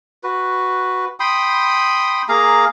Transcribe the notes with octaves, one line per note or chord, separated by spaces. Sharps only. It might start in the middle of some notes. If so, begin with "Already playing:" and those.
F#4 B4
G5 B5 C6 D#6
A#3 G#4 F5 A#5